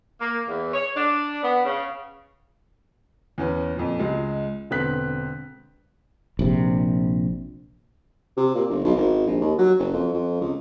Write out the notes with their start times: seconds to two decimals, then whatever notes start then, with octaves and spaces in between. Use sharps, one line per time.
0.20 A#3
0.48 E2
0.74 C#5
0.95 D4
1.43 B3
1.65 C#3
3.38 E2 C#4 B4
3.75 F2 A#2
3.99 C#2 G#3
4.70 E1 D3 B3 C4 F#6 B6
6.39 A#1 C3
8.37 C3
8.55 A#2
8.69 G1
8.84 B1
8.97 G#1
9.27 A#1
9.41 D#2
9.58 F#3
9.79 F#1
9.93 F2
10.13 F2
10.40 C#2